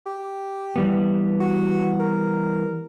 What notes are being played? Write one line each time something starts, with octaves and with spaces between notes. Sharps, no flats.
G4
E3 G3 B3
F#4
A#4